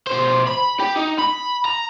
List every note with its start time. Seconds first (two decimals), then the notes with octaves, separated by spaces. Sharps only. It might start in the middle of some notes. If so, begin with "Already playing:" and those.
0.07 B2 C5
0.47 B5
0.79 G4
0.96 D#4
1.18 B5
1.65 A#5